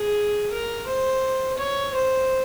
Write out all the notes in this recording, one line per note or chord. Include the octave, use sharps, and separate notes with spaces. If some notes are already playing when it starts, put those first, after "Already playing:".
Already playing: G#4
A#4
C5
C#5
C5